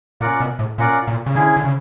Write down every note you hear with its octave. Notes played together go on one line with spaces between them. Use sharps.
A#2 C#4 F4 A#4 D5 F#5
B2
A2
A#2 C#4 F4 A#4 D5 F#5
A#2
C#3
D3 C#4 E4 G#4
D3
C#3